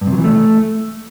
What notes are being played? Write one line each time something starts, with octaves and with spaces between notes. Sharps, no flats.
G2
C3
F#3
E3
A3